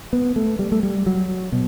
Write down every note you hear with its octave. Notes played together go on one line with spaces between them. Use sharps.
B3
A3
G3
A3
G3
F#3
B2